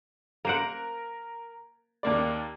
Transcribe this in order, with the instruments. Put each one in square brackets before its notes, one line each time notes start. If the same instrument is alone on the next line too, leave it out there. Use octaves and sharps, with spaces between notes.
[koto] A#3 C5 F#5 [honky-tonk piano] A#4 D7
[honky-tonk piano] D#2 A#3 D5